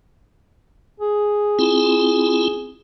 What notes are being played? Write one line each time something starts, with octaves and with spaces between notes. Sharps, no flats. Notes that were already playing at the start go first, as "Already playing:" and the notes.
G#4
C4 E4 F4